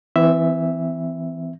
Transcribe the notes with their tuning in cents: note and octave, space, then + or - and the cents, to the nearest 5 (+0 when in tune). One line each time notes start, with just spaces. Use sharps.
E3 +0 C4 -35 E5 +0